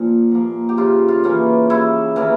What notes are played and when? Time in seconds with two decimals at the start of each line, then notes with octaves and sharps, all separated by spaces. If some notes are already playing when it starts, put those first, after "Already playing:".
Already playing: A#2 F3 A#3
0.31 F3 A#3
0.69 G4
0.78 C#3 F4
1.08 F4
1.24 E3 A#3 C#4
1.70 C#3 E4
2.16 E3 A#3 C#4